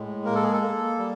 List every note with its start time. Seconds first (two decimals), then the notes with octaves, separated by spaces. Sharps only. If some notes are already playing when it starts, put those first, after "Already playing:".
Already playing: A2 G#3
0.25 A#3 A#4
0.35 A4
0.44 G#4
0.53 A4
0.61 A#3
0.98 G3